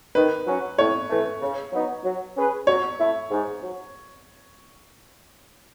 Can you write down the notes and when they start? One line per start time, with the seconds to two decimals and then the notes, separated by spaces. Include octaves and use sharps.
0.15 D#3 B4
0.46 F#3 C#4 F#4
0.78 A2 C#5
1.10 E3 A3
1.42 C#3
1.72 F#3 B3 D#4
2.04 F#3
2.35 C#4 G#4 B4
2.67 F#3 C#5
2.99 A3 E4
3.31 G#2
3.62 F#3